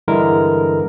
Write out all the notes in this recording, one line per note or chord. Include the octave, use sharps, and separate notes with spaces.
G2 D3 E3 G#3 E4 A#4